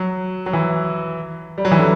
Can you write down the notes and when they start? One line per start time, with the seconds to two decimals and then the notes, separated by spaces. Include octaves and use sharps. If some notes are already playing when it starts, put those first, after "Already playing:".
Already playing: F#3
0.46 F#3
0.53 E3
1.58 G3
1.65 F#3
1.71 E3
1.79 D3